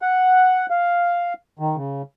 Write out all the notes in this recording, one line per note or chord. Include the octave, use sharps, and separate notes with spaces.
F#5
F5
D#3
C#3